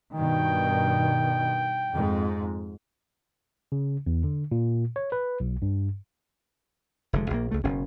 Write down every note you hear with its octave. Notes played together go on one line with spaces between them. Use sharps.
G2 B2 D#3 G5
F2 G#2
C#3
E2
D3
A#2
C#5
B4
B1
G2
F1 D3 G#3
A#1 D#3 A#3
C#2 A3
F#1 B2 C#4